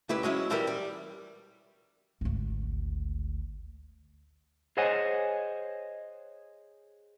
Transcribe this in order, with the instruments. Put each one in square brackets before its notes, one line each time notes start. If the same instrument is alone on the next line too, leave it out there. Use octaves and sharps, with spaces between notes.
[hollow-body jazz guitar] C#2 E4 G4 B4
F#3 G#3 C#4 E4
E3 G3 E4 G4 A#4
G3
[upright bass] G#1 D2
[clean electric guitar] G#4 C5 C#5 D#5 F#5 G#5